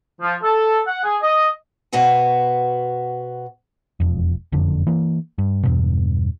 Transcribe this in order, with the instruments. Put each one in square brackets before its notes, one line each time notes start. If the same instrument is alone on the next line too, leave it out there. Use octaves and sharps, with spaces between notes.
[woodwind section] F3
A4
F#5
G#4
D#5
[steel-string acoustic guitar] B2 B3 F#4 C5 G#5
[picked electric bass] E1 F2
F#1 F2 D3
E3 A#3
G2
E2 G2 B2